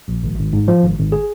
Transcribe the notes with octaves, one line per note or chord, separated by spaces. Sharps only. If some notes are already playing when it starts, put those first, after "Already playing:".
A#1
G#1
G#1
G#2
F3
G#1
G#1
G#4